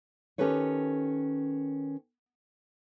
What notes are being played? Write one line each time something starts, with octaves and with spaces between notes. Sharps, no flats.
D#3 C#4 G4 A4 B4 C#5